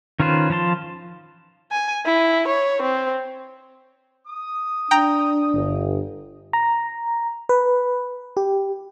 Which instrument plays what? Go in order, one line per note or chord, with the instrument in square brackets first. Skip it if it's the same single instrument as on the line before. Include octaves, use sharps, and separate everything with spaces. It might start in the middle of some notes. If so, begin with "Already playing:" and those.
[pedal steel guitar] D#3 C#4 F4 B4 C5
F3 F4 A5 C6
[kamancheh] G#5
E4
C#5
C4
[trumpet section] D#6
[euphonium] D4 [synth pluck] G5 A#5
[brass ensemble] G1
[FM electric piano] A#5
B4
G4